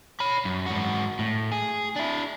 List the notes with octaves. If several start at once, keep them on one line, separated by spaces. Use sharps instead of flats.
C#5 B5
F#2
G#2 F#4
A2
G#4
D4 E4